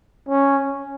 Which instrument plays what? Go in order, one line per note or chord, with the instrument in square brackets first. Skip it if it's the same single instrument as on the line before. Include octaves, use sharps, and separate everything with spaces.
[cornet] C#4